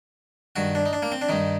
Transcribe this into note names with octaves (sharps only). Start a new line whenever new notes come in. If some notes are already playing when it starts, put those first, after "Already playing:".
G2 D#3 F#4
D4
D#4
D4
A#3
C4
D4
G2 D#3 D#4